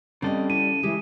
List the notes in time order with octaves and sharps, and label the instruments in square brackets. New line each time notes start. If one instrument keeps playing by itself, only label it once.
[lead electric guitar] C#3 A4 [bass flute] G3 [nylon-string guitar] C4 D#5
[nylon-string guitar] E4 [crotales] D#7
[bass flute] E3 [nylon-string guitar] G#3 G4